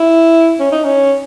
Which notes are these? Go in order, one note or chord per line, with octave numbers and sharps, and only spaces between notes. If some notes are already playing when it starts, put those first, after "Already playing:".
Already playing: E4
C#4
D#4
C#4